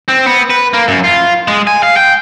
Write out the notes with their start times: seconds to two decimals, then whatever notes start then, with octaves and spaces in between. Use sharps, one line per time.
0.08 C4
0.26 B3
0.50 B4
0.73 A#3
0.88 F#2
1.04 F4
1.48 G#3
1.67 G#5
1.83 F5
1.96 G5